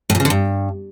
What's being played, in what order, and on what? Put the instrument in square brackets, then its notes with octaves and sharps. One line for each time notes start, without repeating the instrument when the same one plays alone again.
[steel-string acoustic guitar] A2
A#2
C#3
D3
G2